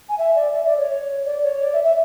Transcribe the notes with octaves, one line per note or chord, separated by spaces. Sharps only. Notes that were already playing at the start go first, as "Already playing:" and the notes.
G#5
E5
D5
E5
D5
C#5
D5
C#5
D5
E5
E5